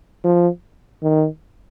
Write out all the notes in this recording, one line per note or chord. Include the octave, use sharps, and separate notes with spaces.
F3
D#3